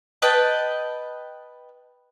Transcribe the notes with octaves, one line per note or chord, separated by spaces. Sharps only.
B4 D#5 G5 A5